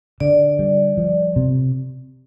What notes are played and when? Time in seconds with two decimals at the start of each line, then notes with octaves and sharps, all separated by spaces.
0.20 D3 D5
0.59 G3
0.97 F3
1.36 C3